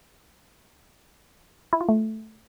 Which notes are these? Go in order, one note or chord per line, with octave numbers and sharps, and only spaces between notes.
E4
F4
A3